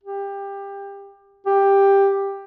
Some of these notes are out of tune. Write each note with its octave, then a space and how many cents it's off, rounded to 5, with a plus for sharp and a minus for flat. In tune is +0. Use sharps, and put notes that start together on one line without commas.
G4 +20
G4 +10